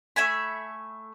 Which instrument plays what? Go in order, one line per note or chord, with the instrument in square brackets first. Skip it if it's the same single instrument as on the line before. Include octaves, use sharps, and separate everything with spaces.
[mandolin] A3 E5 G#5 B5